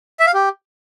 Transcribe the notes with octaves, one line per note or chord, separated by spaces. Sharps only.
E5
F5
G4